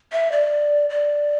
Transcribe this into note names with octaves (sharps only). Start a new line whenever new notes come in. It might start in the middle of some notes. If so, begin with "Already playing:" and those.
E5
D5
D5